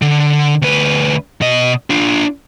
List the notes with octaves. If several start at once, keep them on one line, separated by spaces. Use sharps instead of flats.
D3
D2 B4
B2 D#5
D4 F4